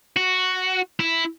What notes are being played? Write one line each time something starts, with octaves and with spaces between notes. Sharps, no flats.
F#4
E4